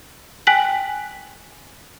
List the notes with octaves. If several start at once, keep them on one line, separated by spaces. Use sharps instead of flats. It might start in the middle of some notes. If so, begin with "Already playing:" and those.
G5 G#5 F#6 B6 F#7